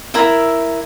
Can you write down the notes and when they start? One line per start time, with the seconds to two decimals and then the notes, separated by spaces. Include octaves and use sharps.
0.14 E4 A#4 E5